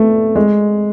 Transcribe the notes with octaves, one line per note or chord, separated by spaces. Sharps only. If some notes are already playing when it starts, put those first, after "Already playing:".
Already playing: A3 B3
G#3